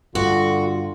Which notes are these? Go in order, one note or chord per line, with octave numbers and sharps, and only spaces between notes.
G2 D3 F4 F#4